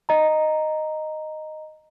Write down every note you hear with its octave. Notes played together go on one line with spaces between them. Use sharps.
D#5 A#5